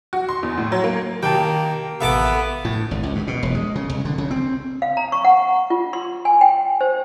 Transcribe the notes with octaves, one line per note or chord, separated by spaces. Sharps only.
F#4
C6
E2
A2
F#3
A#3
D#3 A#3 G4 G5 A5
A1 B3 A4 E5 F5 A5 D6
A2
G#1
C#2
G2
B2
E1
G#3
C#3
C2
D3
C#3
C4
F5
A#5
C#6
F#5
F4
C6
G#5
G5
C5